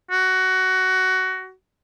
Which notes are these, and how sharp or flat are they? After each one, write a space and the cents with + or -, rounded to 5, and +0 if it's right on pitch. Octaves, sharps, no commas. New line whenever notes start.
F#4 +15